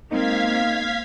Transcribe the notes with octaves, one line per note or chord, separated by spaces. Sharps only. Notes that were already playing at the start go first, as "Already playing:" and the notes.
G#3 A#3 C4 D#4 A#4 F5 G#6 B6